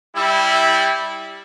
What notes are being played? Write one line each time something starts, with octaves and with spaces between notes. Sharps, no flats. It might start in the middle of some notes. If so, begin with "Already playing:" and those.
G3 E4